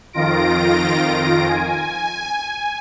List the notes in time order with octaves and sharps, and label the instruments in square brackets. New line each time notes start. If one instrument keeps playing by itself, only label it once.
[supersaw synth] F2 D#3 F4 A#6 D7
G#5